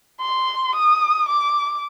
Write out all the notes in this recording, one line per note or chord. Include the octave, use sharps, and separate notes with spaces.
C6
D#6
D6